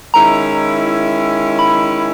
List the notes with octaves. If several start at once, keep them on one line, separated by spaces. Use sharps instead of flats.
D#3 G#3 C#4 E4 A#5
B5